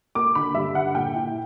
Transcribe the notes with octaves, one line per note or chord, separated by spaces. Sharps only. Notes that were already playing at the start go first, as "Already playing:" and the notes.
A#3 D6
D3 B5
G2 E5
D3 F#5
A#2 G5
E4